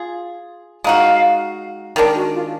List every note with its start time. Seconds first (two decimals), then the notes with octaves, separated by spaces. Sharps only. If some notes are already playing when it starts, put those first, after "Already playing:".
Already playing: F4 G#4
0.84 G#3 D#4 F#4 F5
1.96 D#3 G#3 D4 A#4
2.15 F#4
2.34 F4